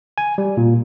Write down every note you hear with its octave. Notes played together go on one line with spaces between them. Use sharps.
G#5
G3
A#2